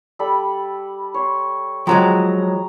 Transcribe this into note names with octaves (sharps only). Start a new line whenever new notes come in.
G3 A4 B5
C#5 C6
F3 F#3 G#3 G5 A#5